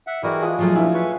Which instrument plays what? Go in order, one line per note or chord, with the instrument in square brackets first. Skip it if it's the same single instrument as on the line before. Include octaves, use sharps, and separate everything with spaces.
[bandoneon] E5 F#5
[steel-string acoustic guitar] E3 G#4 [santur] G3 G#3 [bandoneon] E4 F#4 A#4
[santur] F3 G#3 D#6
[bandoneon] A#2 C#3 F4 [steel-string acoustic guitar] F3 F#3 A3 [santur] F5 G#5
[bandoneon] G2 A#2 [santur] C#4 [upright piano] E4
[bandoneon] B4 C#6